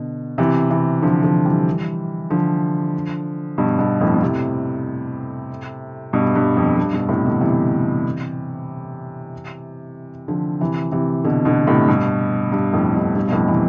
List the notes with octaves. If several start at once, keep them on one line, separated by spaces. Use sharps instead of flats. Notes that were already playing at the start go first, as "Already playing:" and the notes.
Already playing: B2 D3
C3 E3
C3 E3
D3 F3
D3 F3
E3 G3
D3 F3
G2 B2
G2 B2
F2 A2
B2
A2 C3
G2 B2
G2
F2
G2
G2 B2
A2 C3
B2 D3
C3 E3
D3 F3
C3 E3
C3 E3
B2 D3
B2 D3
A2 C3
G2 B2
G2
F2 A2
G2 B2
G2 B2
B2
F2 A2
C3 E3